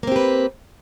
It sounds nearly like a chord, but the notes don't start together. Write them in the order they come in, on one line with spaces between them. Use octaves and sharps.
A#3 C4 G4 B4